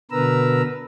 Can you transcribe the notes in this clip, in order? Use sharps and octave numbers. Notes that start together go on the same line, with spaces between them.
B2 D3 A#4 B4 A#5 E6